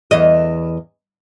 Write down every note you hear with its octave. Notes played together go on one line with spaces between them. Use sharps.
E2 D#5